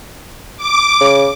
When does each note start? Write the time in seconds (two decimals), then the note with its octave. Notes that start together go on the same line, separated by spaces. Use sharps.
0.57 D6
1.00 C#3